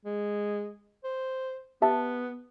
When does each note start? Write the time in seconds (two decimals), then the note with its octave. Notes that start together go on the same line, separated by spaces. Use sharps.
0.05 G#3
1.04 C5
1.82 B3 G4 E5 A5